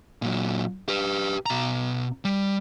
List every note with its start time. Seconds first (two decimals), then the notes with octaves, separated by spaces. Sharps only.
0.22 A#2 F#3
0.88 G4 B4
1.46 B2 A#5
2.25 G3